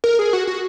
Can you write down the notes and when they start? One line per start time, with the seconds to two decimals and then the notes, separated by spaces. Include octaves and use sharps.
0.04 A#4
0.19 G#4
0.33 F#4
0.47 F#4